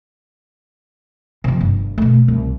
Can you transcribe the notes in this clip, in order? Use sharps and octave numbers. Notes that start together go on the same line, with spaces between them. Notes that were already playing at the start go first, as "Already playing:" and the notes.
C3 F3
G1
B2 A3
C2